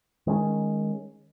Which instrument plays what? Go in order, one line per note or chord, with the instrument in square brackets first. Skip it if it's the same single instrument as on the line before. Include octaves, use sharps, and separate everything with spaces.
[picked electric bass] D#3 G#3 C#4